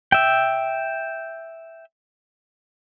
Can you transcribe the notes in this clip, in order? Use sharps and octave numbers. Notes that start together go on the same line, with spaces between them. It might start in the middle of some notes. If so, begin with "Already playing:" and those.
E5 G5